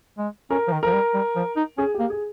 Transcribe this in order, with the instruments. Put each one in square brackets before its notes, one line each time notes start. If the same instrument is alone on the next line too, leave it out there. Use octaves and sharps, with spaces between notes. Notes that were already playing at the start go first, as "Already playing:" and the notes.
[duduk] G#3
[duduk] C#4 [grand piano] A#4
[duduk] F3
D#3
[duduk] F3 [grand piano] A#4
[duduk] G3
G3
F3
D#4
[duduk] C#4 [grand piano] G#4
[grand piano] G4
[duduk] A#3
[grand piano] G#4